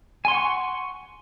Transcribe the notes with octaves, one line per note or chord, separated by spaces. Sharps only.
F#5 G#5 C6 C#6